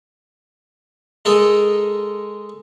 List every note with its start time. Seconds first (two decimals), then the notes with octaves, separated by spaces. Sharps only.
1.25 G#3 A4 A#4 D#5